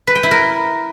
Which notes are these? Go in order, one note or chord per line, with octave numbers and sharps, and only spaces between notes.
B4
G5
E4
A#4